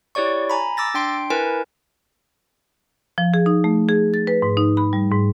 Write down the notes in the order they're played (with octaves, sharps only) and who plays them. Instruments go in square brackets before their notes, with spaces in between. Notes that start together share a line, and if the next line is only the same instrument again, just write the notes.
[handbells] E4 G4 C#5 D5 C#6
G#5 A#5 B5
D6 E6 A6 A#6
D4 G5 C6 D7
E4 A#4 B4 G#5
[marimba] F3
G#4
D#4
A3
G#4
A6
B4
G#2
D#4
B5
G3
G#2